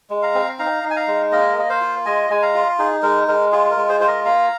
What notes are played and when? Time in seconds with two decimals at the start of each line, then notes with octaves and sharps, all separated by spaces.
0.10 G#3
0.22 F5 A#5
0.34 C4
0.59 D#4 F5 A#5
0.83 D#4
0.91 G#5
0.96 F5 A#5
1.07 G#3
1.32 A#3 A#4 D#5
1.57 A#3 D#5
1.69 C5 F5
1.81 F4
2.05 G#3 D#5 G#5
2.30 G#3 G#5
2.42 F5 A#5
2.54 F4
2.79 D#4 G#4
3.03 G#3 A#4
3.28 G#3 A#4
3.52 F4 G#4
3.71 A#4
3.77 G#3
3.89 G#4 C5
4.01 F4 C5
4.07 A#4 D#5
4.25 A#3 F5 A#5